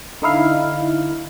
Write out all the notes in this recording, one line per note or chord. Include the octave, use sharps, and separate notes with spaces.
D3 D#4 E4 F5